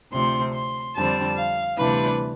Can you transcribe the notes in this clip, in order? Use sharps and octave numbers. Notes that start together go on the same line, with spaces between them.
D2 C3 F3 C4 C6
C6
F2 D3 G3 C4 A5
F5
D2 C3 E3 G3 D4 B4